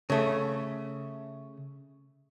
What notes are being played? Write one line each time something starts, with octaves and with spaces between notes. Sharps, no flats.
C#3 A3